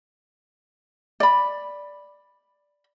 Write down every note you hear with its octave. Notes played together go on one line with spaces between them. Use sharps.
D5 B5